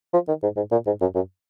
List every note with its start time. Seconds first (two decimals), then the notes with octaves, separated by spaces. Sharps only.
0.14 F3
0.28 D#3
0.43 G#2
0.57 G#2
0.72 A#2
0.86 G#2
1.01 F#2
1.15 F#2